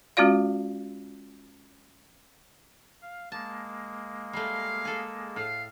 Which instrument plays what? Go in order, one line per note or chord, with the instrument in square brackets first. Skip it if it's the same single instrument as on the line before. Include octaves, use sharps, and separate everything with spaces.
[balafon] G#3 C#4 F4 F#4 D5 F5
[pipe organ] F5
[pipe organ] G#3 A#3 [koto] A5
[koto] G3 A3 [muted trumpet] F5
[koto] G#4 A4
[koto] A2 [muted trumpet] F5